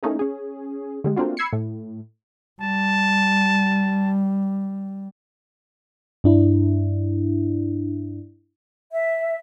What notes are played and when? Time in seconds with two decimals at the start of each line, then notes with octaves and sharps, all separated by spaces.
0.03 A3 A#3 C#4 D#4 E4 G#4
0.19 C#4 G#4
1.04 D3 G3 G#3
1.16 A3 A#3 C4 D4 F4 F#4
1.37 B5 E6 G#6 C7 C#7
1.53 A2
2.61 G3 A5
6.24 G2 D4 E4
8.92 E5